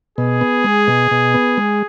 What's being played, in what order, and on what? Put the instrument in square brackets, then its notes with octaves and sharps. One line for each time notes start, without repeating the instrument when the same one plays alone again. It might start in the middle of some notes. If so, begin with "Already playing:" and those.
[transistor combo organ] B2 [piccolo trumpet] G#4
[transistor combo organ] B3
G#3
B2
B2
B3
G#3